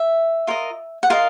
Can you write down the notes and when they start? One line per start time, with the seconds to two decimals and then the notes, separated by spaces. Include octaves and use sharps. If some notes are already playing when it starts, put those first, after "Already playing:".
Already playing: E5
0.47 F4 A#4 D#5
1.03 F#5
1.10 F4 A#4 D#5 F5